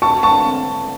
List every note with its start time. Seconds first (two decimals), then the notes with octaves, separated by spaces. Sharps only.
0.02 A5 C#6
0.23 A5 C#6